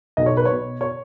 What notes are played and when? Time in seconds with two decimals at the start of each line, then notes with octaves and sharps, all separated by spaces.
0.17 B1 D#5
0.26 C#5
0.37 B4
0.45 B2 C#5
0.81 C#5